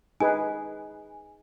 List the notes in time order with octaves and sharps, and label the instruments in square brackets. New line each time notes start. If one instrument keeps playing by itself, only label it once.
[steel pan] D#4 G#4 B4 [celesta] G#5